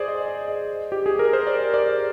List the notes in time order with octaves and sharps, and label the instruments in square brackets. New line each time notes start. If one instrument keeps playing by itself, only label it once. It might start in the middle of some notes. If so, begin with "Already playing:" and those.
Already playing: [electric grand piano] G#4 C5 D5
D#5
D#5
D#5
G4
G#4
A#4
C5
D5
D5